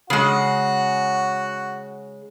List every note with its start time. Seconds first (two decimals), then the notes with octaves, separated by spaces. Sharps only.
0.10 C#3 G#3 F#4 F#5